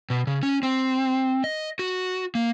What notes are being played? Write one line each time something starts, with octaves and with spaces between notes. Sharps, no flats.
B2
C#3
C#4
C4
D#5
F#4
A#3